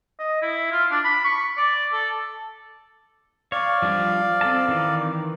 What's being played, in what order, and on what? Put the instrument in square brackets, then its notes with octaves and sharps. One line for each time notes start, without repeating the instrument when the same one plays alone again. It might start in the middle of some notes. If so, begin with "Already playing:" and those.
[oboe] D#5
E4
F4
D4
B5
C#6
D5
A4
[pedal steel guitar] C#5 [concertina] D5 F5
[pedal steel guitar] F3 G3 D4
C4 A4 A5
D#3 E3